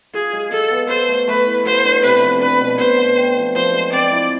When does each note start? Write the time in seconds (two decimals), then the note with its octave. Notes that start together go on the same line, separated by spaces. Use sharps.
0.14 F4 G#4
0.33 G#3
0.51 G#3 A4
0.71 B3
0.89 A4 C5
1.08 A3
1.27 A3 B4
1.46 E4
1.65 B3 C5
1.85 D4
2.03 C3 B4
2.22 F3
2.41 D4 B4
2.60 B2
2.79 B2 C5
2.98 B3
3.18 C4
3.37 F3
3.56 F3 C5
3.74 G#3
3.92 C4 D5
4.11 E4